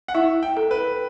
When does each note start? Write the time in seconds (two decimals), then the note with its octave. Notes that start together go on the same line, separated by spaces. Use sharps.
0.08 F#5
0.14 E4 E5
0.43 G5
0.57 A4
0.71 B4